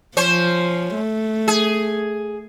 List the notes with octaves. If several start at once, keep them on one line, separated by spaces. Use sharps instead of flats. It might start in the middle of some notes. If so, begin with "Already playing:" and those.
F3 C#4 C5
A3
G#4